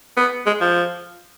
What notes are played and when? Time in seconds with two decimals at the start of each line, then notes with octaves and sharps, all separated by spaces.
0.17 B3
0.46 G#3
0.61 F3